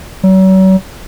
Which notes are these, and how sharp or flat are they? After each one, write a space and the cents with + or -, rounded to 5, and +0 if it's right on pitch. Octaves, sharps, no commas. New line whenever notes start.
F#3 +40